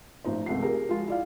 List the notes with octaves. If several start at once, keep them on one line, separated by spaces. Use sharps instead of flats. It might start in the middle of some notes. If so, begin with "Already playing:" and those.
A1 F3 D#4 C5
G#1 C#2 F3 A3 F#5 C7
G4 G#4 A#4
F3 G#3 F4 F#4
E4 D5 F5